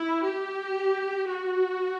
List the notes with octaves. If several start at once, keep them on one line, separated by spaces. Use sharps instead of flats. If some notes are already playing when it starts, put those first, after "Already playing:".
Already playing: E4
G4
F#4